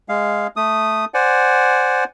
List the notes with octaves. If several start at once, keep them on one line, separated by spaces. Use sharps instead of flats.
G#3 F5
A3 D#6
C5 D5 F#5 G#5